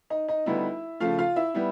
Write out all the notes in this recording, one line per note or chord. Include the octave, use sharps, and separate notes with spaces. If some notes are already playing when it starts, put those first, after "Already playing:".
D#4 D#5
D#4 D#5
D2 D3 G3 B3 D#4 E4 E5
C#3 F3 A3 F4 F5
F4 F5
E4 E5
G3 B3 E4